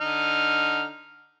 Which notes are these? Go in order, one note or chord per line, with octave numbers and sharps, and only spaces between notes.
D3 D#4 F6